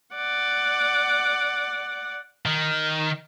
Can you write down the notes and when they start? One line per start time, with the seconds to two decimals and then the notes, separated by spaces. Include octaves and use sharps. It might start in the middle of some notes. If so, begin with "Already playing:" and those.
0.15 D5 F#5
2.46 D#3